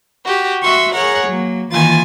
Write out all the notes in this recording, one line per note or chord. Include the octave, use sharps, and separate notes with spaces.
F#4 G4
F#4 E5 C6 C#6
G#4 A#4 C#5 F#5
F#3 A#3
D#3 E3 A#3 F4 G#5 A6